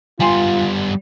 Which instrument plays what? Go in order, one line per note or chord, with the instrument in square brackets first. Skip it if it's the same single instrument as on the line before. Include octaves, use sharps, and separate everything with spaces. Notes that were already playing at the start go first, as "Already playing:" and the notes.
[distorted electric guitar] G3 B3 [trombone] F4 [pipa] G4 G#5 C6